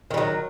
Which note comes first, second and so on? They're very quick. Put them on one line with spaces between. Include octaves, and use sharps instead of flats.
D#3 G3 F#3